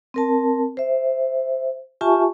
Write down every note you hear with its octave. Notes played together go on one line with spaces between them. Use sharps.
C4 A#4 A5
C5 E5
F4 G4 E5 G#5 A5 C#6